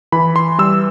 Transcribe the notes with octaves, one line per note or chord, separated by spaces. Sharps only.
E3 B5
C6
G3 E6